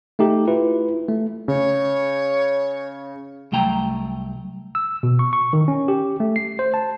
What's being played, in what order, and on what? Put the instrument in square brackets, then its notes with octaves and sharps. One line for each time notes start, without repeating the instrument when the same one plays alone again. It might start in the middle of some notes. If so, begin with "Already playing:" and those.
[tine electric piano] A3 D#4 G4
E4 F4 B4
A3
[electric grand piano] C#3 [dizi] C#5
[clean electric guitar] C2 F#3 A3 G5 A#5
[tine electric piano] E6
B2
C#6
C#6
D#3
C#4
G4
A3
C7
C5
A5